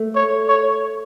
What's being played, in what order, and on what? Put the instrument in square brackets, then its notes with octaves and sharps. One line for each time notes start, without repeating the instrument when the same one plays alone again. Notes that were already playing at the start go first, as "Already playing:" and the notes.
Already playing: [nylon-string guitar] A3
[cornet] C#5
C#5